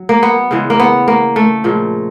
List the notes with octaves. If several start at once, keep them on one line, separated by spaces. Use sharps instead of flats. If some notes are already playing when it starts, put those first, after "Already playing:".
Already playing: F#3
A#3
B3
C#3 E3 G#3
A#3
B3
A#3
A3
A#2 F3 G#3